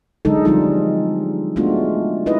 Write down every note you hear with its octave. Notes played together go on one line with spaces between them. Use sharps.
D3 F#3 G#3 D4 D#4 A4
F3 G3 G#3 C4 D#4 F4
G#3 A3 B3 D4 F4 F#4
D#4 E4 B4 D#5